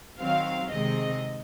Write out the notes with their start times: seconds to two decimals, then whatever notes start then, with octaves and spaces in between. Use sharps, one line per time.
0.19 D#3 F#3 C4 F5
0.71 C3 D#3 G#3 C4 D#5